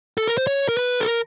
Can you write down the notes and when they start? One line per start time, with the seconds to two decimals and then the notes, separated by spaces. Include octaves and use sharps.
0.18 A4
0.27 A#4
0.38 C5
0.47 C#5
0.69 A#4
0.77 B4
1.00 A4
1.06 A#4